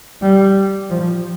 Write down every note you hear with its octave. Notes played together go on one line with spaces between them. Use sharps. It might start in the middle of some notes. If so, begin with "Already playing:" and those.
G3
F3